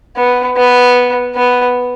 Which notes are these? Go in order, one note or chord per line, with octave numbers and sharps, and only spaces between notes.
B3
B3
B3